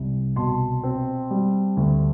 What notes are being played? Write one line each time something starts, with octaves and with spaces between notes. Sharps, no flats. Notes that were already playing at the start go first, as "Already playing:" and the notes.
Already playing: C2 G3
B2 A5 C6
C4
G3
D2